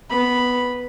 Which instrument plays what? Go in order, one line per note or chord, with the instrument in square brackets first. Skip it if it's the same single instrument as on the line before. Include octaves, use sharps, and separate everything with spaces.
[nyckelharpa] B3 B5